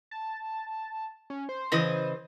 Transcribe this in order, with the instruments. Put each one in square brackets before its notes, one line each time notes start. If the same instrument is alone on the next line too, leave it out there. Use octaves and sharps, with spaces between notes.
[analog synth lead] A5
C#4
C5
[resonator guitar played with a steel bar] C#3 E3 D#5